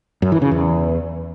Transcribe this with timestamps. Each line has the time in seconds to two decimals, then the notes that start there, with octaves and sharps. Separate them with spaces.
0.22 F#2
0.32 E3
0.42 C#3
0.51 E2